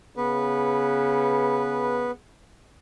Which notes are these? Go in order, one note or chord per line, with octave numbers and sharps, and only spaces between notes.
C#3 B3 B4